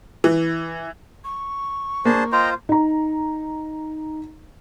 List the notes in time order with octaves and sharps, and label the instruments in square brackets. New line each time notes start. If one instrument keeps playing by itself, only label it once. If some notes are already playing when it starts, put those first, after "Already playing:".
[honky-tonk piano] E3
[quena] C#6
[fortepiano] A#3 [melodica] D4 [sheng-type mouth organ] G#4 C5 A5
[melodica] F4 C5 [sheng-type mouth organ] D#5 G5 A#5
[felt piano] D#4 A#5